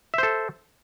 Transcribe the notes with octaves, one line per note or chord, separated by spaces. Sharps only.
A4 C5 E5